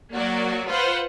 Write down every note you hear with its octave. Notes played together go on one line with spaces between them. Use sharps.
F#3 A#3 F#4 D5
F4 B4 C5 F#5